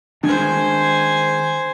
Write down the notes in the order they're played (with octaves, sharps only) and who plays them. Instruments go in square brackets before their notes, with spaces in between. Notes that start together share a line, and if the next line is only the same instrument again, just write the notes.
[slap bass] D#3 G#3 [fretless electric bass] D4 [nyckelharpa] C5 G#5